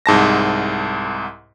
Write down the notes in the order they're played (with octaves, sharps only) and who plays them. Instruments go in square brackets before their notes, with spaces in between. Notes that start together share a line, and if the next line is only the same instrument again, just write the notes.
[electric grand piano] C2 G#2 A5 A#6